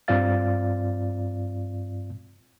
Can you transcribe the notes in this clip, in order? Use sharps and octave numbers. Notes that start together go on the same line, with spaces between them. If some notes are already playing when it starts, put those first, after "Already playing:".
G2 C4 F4 D5 F5 A6